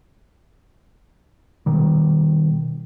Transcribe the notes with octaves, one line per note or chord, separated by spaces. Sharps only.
B2 D#3 G3